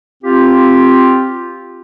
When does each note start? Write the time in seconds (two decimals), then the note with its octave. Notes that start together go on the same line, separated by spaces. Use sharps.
0.23 C4 F4 G4